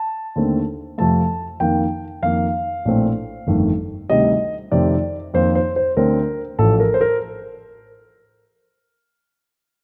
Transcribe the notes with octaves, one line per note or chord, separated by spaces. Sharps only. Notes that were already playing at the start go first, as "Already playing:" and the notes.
Already playing: A5
D#2 D3 A3 C4
F2 C3 F3 A3 A5
F2 D#3 A#3 G5
F2 D#3 A#3 F5
A#1 A2 A3 C4
G1 F2 D#3 A3
D2 C3 D#3 G3 C4 D#5
F2 C3 D#3 A3 C4 D5
F2 D#3 A#3 C5
C5
C5
D2 D3 A3 C4 A#4
A1 A2 F3 A3 A4
A#4
C5
A#4